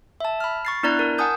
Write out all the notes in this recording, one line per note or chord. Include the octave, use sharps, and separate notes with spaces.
E5 A5
B5 F6
C#6 A6 C7
B3 D4 E4 D5 A#5 F#6
A#4
F#5 G#5 A5 D#6 G6